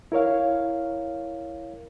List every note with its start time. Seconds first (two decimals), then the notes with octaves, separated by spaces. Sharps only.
0.12 E4 A#4 C#5 F5